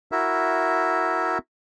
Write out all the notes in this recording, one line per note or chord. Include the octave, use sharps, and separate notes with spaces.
E4 F#4 A#4 E5